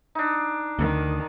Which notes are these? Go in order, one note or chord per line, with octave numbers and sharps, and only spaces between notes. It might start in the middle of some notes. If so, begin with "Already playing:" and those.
D4 D#4
D2 D#3